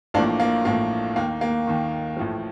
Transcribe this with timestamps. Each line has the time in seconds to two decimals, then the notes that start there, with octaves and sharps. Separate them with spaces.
0.14 A1 A2 F3 A#3 D4
0.40 A#3
0.65 A1 A2 F3 A#3
1.16 D#2 D#3 A#3
1.41 A#3
1.67 D#2 D#3
2.17 A1 A2 F3